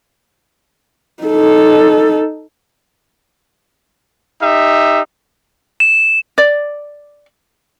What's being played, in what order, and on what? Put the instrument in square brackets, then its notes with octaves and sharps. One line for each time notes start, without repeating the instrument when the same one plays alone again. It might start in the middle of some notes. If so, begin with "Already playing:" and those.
[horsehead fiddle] D#4 A4
[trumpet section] D#4 G4 E5
[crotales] E7
[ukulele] D5